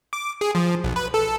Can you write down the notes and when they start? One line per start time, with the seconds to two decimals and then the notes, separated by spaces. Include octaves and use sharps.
0.13 D6
0.41 G#4
0.55 F3
0.84 B1
0.96 B4
1.14 A4